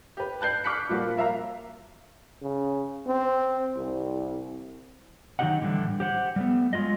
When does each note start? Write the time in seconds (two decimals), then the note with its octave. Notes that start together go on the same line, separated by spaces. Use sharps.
0.17 G4 B4
0.41 A5 F#6 G6 C7
0.64 C#6 D6 F6 F#6 B6 C#7
0.89 A#2 F3 G3 A#3 F#4
1.16 F4 A#4 E5 F5 A#5
2.42 C#3
3.07 C4
3.77 C2
5.39 D#3 F#3 D#4 G4 D#5 F#5
5.61 A2 D3 E3 G3 A3
6.00 G4 C5 F#5
6.36 G3 A3 B3
6.73 F#3 G#3 F4 F#4 D#5